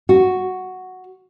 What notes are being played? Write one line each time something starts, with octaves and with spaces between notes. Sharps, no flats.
F#4